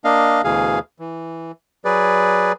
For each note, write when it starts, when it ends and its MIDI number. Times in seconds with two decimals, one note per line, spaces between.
0.04 0.42 58
0.04 0.42 62
0.04 0.42 75
0.04 0.42 77
0.44 0.79 38
0.44 0.79 47
0.44 0.79 52
0.44 0.79 68
0.44 0.79 77
0.99 1.52 52
1.85 2.52 54
1.85 2.52 68
1.85 2.52 71
1.85 2.52 74